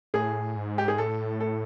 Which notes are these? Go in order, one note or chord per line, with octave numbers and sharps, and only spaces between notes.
A2 G#4
G#2
G4
G#4
A2 A4
A4